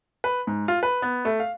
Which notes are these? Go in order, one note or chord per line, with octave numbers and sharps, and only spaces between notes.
B4
G#2
F4
B4
B3
A3
F5